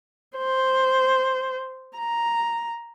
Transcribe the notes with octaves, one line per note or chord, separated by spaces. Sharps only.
C5
A#5